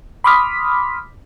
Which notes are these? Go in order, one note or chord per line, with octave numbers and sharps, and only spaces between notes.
B5 C6 D6 D#6 F6 B6